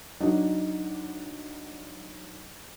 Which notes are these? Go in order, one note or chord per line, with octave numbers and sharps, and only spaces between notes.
F#3 D4 D#4